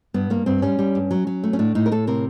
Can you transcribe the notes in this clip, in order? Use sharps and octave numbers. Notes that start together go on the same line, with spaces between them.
G2 B3
G2 A#3
G2 C4
G3 C#4
G3
G2
F#3
F#3
A3
C#4
A2 D4
A2 D#4
A#4
A2 A4
C3 A#4